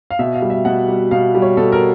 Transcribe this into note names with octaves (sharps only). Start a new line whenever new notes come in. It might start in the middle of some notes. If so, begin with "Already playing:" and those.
F5
B2 E5
F5
G3
E5
B2 F#5
G3
B2 F5
G3
C#5
B2 A4
A#4